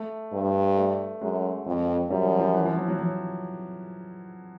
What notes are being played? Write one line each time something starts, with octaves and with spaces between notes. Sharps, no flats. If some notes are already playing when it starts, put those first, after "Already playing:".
Already playing: A3
G2
A3
F#2 G#3
F2
F#2 G3
F3
F3
E3
F3
F#3
F#3
F#3